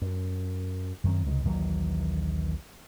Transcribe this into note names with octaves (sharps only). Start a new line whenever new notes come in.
F#2
F#2 D#3 C4
C#2 C3 F#3 G#3
A#1 D#2 E3 F#3